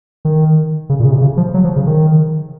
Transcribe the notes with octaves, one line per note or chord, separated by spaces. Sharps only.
D#3
C#3
A#2
C#3
C3
C#3
F3
F#3
F3
C#3
D#3